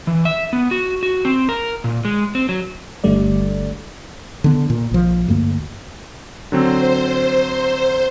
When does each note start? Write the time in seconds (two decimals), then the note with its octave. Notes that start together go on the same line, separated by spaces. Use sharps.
0.07 E3
0.25 E5
0.53 B3
0.71 F#4
1.03 F#4
1.25 C4
1.49 A#4
1.84 A#2
2.05 G#3
2.35 C4
2.49 F#3
3.04 G1 D3 G3 A3 D5
4.44 D3 B3
4.70 A#2
4.91 A#1 F3
5.28 D2 G2 A#3
6.52 D3 F#3 C4 C5